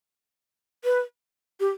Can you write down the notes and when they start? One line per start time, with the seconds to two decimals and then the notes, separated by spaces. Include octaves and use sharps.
0.84 B4
1.60 G4